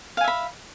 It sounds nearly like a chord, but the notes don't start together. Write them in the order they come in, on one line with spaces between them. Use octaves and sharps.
F5 G#5 E5 B5